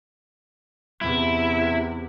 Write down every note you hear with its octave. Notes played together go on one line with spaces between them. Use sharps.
E2 C3 E4